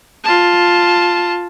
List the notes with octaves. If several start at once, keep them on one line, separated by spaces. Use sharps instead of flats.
F4 A5